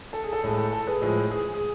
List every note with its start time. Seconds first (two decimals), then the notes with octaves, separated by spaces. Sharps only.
0.13 A4
0.24 G#4
0.33 A4
0.43 A2 G#3 G#4
0.58 A4
0.73 A4
0.87 G#4 B4
1.01 A2 F3 G#3 G#4
1.31 G#4
1.54 G#4